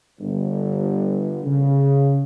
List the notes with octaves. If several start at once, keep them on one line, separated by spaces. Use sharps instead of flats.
G1
C#3